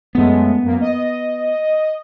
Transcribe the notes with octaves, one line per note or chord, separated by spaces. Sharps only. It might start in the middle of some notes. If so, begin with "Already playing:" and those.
F#2 G#3 A3 B3
F#2 A#3
D#5